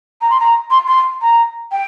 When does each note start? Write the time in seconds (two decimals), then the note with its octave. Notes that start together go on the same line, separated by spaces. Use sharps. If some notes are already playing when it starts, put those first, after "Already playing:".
0.21 A#5
0.30 C6
0.40 A#5
0.71 C6
0.87 C6
1.22 A#5
1.72 G5